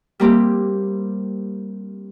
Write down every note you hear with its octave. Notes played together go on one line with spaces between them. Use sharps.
G3 A#3 C4 G4